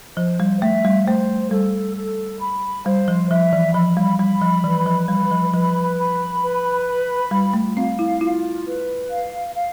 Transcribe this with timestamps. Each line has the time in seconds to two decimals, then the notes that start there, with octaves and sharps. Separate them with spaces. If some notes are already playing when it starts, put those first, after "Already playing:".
0.17 F3 C5
0.40 G3
0.62 A3 E5
0.85 G3
1.07 A3 C5
1.51 G3 A4
1.96 A4
2.40 B5
2.86 G3 C5
3.08 F3
3.30 F3 E5
3.53 E3
3.74 F3 B5
3.97 G3
4.19 G3 B5
4.41 F3
4.64 E3 B4
4.86 F3
5.08 G3 B5
5.31 F3
5.53 F3 B4
5.98 B5
6.43 B4
6.87 B5
7.31 G3 F4
7.54 A3
7.76 C4 F5
7.99 E4
8.21 E4 F4
8.66 B4
9.10 F5
9.55 F5